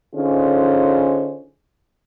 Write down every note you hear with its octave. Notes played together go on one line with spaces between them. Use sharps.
D3 C#4 D#4 F4 G#4 C5